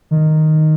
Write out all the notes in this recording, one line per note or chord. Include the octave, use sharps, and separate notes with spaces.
D#3